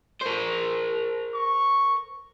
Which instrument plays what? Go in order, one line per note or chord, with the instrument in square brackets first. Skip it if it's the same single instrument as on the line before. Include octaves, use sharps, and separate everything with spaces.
[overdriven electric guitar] A#4 C5
[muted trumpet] C#6